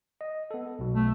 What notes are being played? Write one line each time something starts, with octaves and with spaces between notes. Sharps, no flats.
D#5
B3 A4
B1 B2
A3